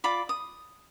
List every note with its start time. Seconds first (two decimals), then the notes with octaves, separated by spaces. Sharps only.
0.04 F4 D5 B5 D6
0.29 D#6